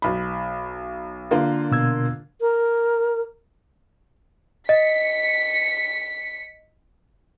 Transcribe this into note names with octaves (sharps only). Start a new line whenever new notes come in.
B1 B5
D3 A#3 F4
B2 E6 G#6
A#4
D#5 B6 C#7